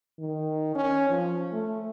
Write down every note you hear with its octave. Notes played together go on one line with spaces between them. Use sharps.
D#3
C#4
F3
A3